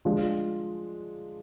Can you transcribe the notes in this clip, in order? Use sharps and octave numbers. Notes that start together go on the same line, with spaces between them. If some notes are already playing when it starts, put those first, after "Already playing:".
F3 G#3 D4